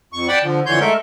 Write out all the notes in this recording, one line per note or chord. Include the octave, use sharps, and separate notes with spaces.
F2 C#6
D5 F#5 G5 A5 B5
D3 F3
F2 D3 E3 C#5 C6 G6
G#3 A3 A4 A#4 E5